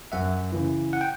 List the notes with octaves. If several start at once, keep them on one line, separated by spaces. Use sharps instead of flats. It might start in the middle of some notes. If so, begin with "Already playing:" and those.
F#2 E5 F#5
C#3 E3
F#5
G5